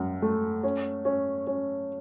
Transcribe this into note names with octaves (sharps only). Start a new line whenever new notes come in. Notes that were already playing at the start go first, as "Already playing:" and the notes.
Already playing: F#2
A3
C#4
C#4
C#4